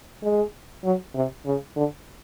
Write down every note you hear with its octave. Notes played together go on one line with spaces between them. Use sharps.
G#3
F#3
C3
C#3
D3